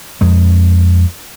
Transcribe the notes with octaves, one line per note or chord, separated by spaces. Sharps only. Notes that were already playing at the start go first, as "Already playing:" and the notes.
F2 G#3